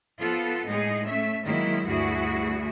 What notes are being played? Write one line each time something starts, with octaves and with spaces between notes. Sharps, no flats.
F3 B3 F4 A4
A2 G#3 D#4 G#4
A3 C#4 E5
D#3 F#3 G#3 A#3 E4
D2 G2 E4 F#4 G#4